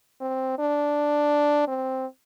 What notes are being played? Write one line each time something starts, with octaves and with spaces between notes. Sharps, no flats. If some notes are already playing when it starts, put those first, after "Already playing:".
C4
D4
C4